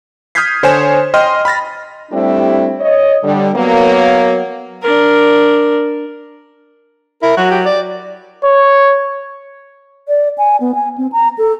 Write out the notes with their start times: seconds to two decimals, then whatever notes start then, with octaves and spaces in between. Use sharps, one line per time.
0.35 D#6 F6 G6 G#6 B6 C7
0.63 D3 C5 C#5 G#5 E7
1.14 D#5 G5 C6 F6
1.45 B5 F6 A6 A#6
2.11 G3 A3 C4 D4 E4 G4
2.80 C#5 D#5
3.23 D3 G3
3.54 F#3 A#3 B3
4.82 D4 A#4
7.23 E4 A#4
7.37 F#3 F#4
7.51 G4
7.66 D5
8.44 C#5
10.08 D5
10.38 G#5
10.61 B3
10.75 G#5
10.98 C4
11.12 A#5
11.38 A4